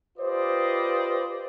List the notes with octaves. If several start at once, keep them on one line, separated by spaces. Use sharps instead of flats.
F4 G4 B4 C5 D5 D#5